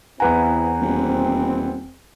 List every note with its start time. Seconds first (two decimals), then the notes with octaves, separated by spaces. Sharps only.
0.20 E2 B3 C4 E4 B4 F#5 G#5 A#5
0.81 D#1 C4